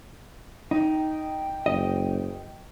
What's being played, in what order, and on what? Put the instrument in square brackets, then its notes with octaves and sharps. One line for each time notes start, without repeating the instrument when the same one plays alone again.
[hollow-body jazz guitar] D#4 [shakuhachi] G5
[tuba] F#1 [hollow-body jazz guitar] D#5